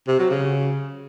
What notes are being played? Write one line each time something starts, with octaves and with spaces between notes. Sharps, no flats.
C3
F#3
C#3